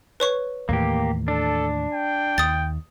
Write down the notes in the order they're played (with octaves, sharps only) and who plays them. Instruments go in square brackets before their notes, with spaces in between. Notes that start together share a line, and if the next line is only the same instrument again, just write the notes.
[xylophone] B4 C#5 C#6
[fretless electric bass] D#2 A2 E3 [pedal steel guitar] A#3 G4
[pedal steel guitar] D4 [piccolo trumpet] A4
[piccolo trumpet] G5
[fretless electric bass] D#2 [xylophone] D#6 A6